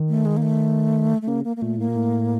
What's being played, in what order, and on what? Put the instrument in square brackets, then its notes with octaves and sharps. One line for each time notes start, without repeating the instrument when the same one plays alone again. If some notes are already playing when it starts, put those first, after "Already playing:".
Already playing: [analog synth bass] D#3
[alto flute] A3
G#3
A#3
A3
A3
[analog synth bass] C#3 [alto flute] A#3
[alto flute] A#3
A#3
[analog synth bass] A#2 [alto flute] A3
[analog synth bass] A2 [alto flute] A#3
[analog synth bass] A#2
A2